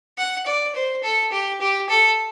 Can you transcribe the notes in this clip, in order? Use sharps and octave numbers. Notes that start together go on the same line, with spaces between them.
F#5
D5
C5
A4
G4
G4
A4